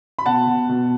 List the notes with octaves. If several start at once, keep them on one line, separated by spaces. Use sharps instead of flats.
B5
B2 F#5 A5
B2
B2